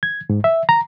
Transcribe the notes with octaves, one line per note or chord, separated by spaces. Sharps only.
G#6
G#2
E5
A#5